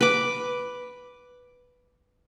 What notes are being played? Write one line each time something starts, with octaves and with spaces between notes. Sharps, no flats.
B4 D6